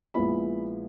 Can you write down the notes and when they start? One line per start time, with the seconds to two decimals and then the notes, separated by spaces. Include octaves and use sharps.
0.14 A#1 A#2 G#3 B3 E4 B5